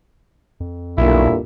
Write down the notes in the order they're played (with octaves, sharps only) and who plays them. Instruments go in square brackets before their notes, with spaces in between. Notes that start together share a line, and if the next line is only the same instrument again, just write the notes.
[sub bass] F2
[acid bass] B1 [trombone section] G2 A#2 D3 [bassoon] E4